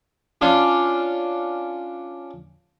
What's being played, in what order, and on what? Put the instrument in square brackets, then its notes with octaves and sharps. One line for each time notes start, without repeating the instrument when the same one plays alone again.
[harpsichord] C#4 D4 F4